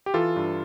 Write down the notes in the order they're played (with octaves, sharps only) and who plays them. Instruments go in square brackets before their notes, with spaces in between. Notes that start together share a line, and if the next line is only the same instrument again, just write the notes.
[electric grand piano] G4
E3 F4 A4
G2